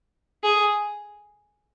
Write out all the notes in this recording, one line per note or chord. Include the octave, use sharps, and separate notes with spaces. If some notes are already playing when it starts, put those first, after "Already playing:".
G#4